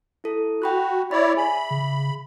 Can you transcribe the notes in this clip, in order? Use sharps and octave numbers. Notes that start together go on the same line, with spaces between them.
E4 A4
F#4 G5 B5 F#6
E4 C#5 D5 B5
G#4 E5 G#5 B5
C#3